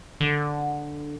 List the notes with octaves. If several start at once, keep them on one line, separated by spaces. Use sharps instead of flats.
D3